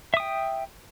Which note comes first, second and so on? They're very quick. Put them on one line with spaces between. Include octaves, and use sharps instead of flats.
E5 D#6 G5